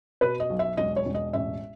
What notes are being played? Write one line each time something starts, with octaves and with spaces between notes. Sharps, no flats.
B2 B4
D#5
B1
E5
E1 D#5
C#5
E1
D#5
A1 E5